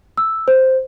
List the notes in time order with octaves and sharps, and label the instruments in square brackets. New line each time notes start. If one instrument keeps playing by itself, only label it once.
[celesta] E6
C5